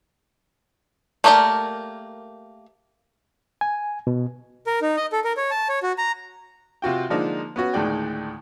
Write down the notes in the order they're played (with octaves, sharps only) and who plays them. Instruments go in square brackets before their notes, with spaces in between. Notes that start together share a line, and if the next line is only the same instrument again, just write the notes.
[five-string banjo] A3 A#3 G4 A#4 D5
[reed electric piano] G#5
B2
[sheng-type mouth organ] A#4
D#4
D#5
A4
A#4
C#5
A5
C#5
F#4
A#5
[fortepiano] C3 F4 F#4 G5
D3 F3 G#3 A#3 D4 D#4
B3 C#4 F#4
D2 A2 D#3 G#3 D5 G5